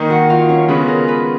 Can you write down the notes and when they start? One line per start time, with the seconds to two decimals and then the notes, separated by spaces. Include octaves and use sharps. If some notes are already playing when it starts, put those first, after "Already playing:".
Already playing: D#3 A#3 D#4
0.10 F#4 F#5
0.30 F4 F5
0.49 C#4 C#5
0.68 C#3 G#3 B3 F#4 B4
0.88 A#4
1.08 B4